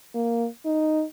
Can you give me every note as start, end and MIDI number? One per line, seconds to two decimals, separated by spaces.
0.15 0.47 58
0.65 1.04 63